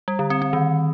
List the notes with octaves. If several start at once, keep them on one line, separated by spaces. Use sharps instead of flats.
G3
D3
C4
C4
D#3